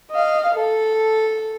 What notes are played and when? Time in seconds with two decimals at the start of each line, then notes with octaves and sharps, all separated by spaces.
0.11 D#5 F5
0.55 A4